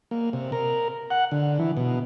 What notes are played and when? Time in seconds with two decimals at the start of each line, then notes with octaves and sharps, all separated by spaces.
0.11 A#3
0.33 C3
0.52 A#4
1.10 F#5
1.31 D3
1.59 E3
1.77 B2